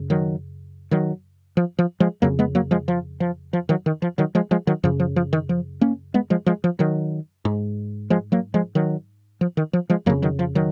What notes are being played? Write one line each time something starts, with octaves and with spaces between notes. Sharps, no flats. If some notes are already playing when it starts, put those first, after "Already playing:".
Already playing: F#2 C#3
D#3 F#3
D#3 F#3
F3
F3
F3 G#3
F2 C#3 F#3 A#3
G#3 B3
F#3 A#3
F3 G#3
F3
F3
F3
D#3 F#3
D#3
F3
D#3 F#3
F3 G#3
F3 G#3
D#3 F#3
F#2 C#3 F3
F3
F3
D#3
F3
A#3 C#4
G#3 B3
F3 G#3
F3 G#3
F3
D#3 F#3
G#2
F3 G#3
F#3 A#3
F3 G#3
D#3 F#3
F3
D#3
F3
F3 G#3
F2 C#3 F#3 A#3
D#3 F#3
F3
D#3 F#3